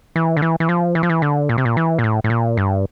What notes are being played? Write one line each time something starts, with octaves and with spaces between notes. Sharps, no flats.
E3
D3
E3
E3
F3
E3
F3
E3
D3
A#2
C3
A#2
E3
A#2
A2
A2
A#2
G2